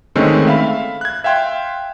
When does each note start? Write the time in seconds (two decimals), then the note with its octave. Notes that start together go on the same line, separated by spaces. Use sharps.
0.15 D3 D#3 G#3 A3 C4 C#4
0.47 E5 F5 B5
1.01 F#6 G#6
1.24 E5 F5 G5 C6